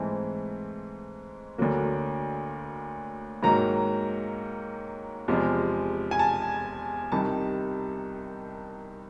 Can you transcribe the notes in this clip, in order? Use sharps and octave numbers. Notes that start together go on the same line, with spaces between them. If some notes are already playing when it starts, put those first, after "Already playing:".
Already playing: G#2 E3 A3 C4
D2 D3 F#3 A#3
G#2 D#3 F#3 A#3 A#5
E2 C3 F3 G#3
G#5
A5
C2 C3 D#3 A5